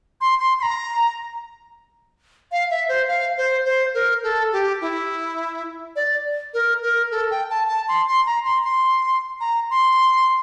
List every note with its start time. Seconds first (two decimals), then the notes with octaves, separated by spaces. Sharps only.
0.21 C6
0.40 C6
0.59 C6
0.63 A#5
2.52 F5
2.71 E5
2.89 C5
3.08 F5
3.38 C5
3.65 C5
3.94 A#4
4.23 A4
4.52 G4
4.81 E4
5.96 D5
6.54 A#4
6.83 A#4
7.11 A4
7.31 G5
7.50 A5
7.68 A5
7.88 C6
8.07 C6
8.26 A#5
8.45 C6
8.64 C6
9.41 A#5
9.70 C6